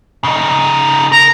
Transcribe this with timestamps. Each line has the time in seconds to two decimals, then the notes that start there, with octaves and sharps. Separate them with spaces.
0.24 C#3 D#4
1.12 A#4 A#5